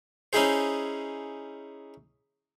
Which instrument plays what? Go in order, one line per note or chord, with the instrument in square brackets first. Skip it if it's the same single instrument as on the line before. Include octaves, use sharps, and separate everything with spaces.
[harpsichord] C#4 D#4 E4 G#4 C5